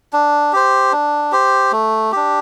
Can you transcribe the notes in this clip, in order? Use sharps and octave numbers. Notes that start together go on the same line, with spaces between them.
D4
G4 C5
D4
G4 C5
A3
D4 G4